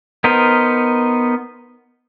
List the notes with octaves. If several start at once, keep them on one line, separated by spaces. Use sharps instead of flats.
B3 D#4 A#4 C5